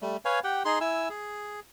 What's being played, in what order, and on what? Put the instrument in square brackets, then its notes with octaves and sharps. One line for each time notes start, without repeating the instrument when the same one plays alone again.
[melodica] G3 A3
B4 C#5 F5 G#5
G4 F#5 G5
D#4 G#4 C6
E4 G#5 E6
G#4